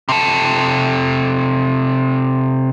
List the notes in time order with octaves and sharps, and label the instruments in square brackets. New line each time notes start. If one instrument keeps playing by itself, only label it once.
[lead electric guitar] C3 A4